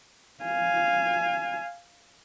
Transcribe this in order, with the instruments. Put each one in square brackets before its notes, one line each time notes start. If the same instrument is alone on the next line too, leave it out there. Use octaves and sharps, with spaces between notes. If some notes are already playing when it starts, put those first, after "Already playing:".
[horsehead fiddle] F5 G#5